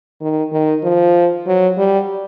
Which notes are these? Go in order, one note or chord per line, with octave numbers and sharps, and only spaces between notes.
D#3
D#3
F3
F#3
G3